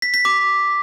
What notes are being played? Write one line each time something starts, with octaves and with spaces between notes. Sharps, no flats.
B6
B6
D6